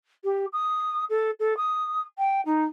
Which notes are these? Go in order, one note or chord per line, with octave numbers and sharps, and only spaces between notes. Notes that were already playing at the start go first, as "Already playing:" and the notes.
G4
D#6
A4
A4
D#6
G5
D#4